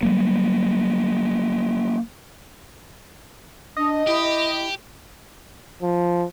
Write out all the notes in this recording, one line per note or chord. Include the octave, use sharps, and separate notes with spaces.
F#3 G3 A#3
D4 D#5
E4 G4
F3